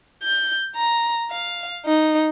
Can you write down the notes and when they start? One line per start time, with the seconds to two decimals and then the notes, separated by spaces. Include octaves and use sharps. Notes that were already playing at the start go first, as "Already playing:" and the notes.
0.23 G6
0.76 A#5
1.31 F5
1.85 D#4